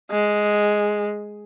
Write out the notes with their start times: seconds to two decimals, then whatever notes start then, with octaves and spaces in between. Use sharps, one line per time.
0.11 G#3